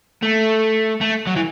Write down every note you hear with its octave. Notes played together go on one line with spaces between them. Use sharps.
A3
A3
F#3
E3